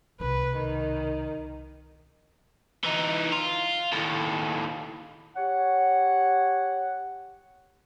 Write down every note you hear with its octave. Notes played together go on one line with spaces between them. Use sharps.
C2 B2 B4
D#3
E3 D#4
F4
D#2 A2
G4 C#5 F#5